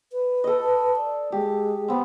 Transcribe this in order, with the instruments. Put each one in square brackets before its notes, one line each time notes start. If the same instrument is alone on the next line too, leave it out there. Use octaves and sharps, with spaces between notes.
[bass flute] B4
[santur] A4 D#5
[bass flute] D5
[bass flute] G#3 [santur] G4
[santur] B3 C4